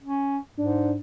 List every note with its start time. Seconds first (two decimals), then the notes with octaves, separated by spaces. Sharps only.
0.02 C#4
0.58 G#2 D4